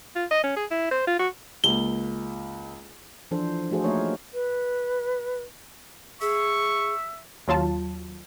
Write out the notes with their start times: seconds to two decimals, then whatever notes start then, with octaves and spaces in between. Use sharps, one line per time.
0.16 F4
0.31 D#5
0.44 C#4
0.56 G#4
0.71 E4
0.91 C5
1.07 F4
1.19 F#4
1.64 C#2 A#3 G7
3.31 E3 F3 D4 A4 C5
3.71 F3 A3 F#4 G#4 A4 C5
3.84 A3 A#3 D#4 A#4 C#5
4.33 B4
6.21 G#4 E5 C#6
7.48 D#2 F#3 F4 A5